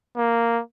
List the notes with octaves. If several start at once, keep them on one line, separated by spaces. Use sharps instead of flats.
A#3